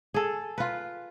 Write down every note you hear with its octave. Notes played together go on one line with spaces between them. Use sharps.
G#4 A4
F4 B4